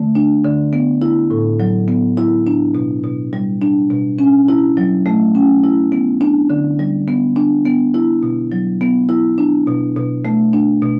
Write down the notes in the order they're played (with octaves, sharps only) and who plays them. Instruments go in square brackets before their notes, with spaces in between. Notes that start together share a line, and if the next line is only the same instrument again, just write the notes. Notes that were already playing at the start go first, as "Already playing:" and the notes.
Already playing: [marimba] D3 A3
D4
D3
B3
E4
A2
F#3
B3
E4
D4
B2
B2
G3
D4
B2
C#4
E4
F#3
A3
C#4
E4
B3
D4
D3
G3
B3
D4
B3
E4
B2
F#3
B3
E4
D4
B2
B2
A3
D4
B2